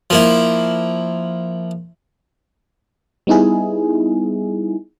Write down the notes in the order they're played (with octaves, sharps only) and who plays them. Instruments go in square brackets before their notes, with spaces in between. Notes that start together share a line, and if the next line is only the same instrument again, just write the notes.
[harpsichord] F3 A#3 E4
[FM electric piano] G3 B3 D#4 E4 G#4